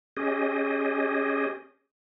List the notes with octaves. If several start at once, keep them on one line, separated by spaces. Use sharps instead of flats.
C#4 G4 G#4 D#5